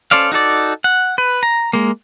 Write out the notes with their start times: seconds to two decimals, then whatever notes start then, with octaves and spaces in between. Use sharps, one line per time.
0.11 C#4 A4 C5 D5 F5
0.32 D#4 F#4 A4 D5
0.84 F#5
1.18 B4
1.43 A#5
1.73 G#3 A#3